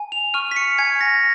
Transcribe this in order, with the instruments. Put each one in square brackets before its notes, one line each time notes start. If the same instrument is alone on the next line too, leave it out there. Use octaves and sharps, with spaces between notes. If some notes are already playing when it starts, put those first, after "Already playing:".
Already playing: [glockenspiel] G#5
F7
C#6 F6 D#7
B6
C#7
G#5 G#6
A#6